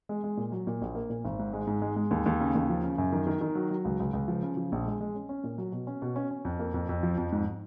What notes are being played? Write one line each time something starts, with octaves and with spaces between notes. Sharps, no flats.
G#3
G#3
A#2
F#3
A#2
A#1
A#3
A#2
G#1
G#2
G#3
G#2
G#3
G#3
D#2
D#2
C#3
D#2
F3
C#3
F#2
D#3
D#3
D#3
F#3
F#3
C#2
C#2
C#2
F3
C#3
F3
A#1
G#3
G#3
C#4
C#4
A#2
F#3
B2
C#4
B2
C#4
C#4
F2
A#3
F2
F2
F3
F2
G#2